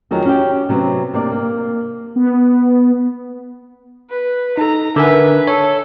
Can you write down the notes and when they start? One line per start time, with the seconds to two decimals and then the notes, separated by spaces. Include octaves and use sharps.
0.11 F2 D#3 F#3 G#4
0.26 C#4 F#4 G4 G5
0.69 C3 F#3 B3 C4
1.14 C3 A#3 D4 D5
1.32 A#3
2.16 B3
4.10 B4
4.58 D#4 A4 A#5
4.96 D3 A#4 B4 E5 G#5
5.47 A4 C#5